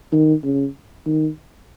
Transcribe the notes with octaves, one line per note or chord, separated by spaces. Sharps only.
D#3
C#3
D#3